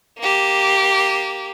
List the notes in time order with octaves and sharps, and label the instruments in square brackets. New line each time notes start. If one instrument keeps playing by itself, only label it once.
[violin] A#3 G4